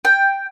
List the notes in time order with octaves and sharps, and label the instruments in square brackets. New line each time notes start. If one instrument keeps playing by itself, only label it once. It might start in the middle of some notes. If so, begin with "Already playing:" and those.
[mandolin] G5